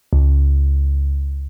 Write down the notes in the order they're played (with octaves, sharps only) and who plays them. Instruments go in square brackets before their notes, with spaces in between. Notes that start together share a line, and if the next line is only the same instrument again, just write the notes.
[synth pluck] C#2